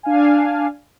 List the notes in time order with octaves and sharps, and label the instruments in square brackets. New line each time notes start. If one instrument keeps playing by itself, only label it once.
[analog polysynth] D4 F5 G#5